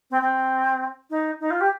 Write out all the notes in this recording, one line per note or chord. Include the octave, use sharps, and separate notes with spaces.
C4
C4
D#4
D#4
F4
G4